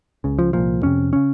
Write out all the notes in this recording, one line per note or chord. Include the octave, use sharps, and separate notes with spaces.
C#2 C#3
F3
C2 A#2 F3
F2 C3 C#4
C#3 C#4